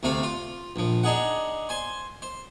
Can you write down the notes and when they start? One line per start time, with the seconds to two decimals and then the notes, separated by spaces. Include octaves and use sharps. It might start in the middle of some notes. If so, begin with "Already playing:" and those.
0.03 D2 C3 A3 F5
0.23 F4
0.76 A#1 F3
1.03 D4 D#4 G#4 F#5
1.69 C5 G#5 C6
2.22 C5